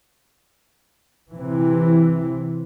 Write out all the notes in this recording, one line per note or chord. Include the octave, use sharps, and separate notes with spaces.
C3 E3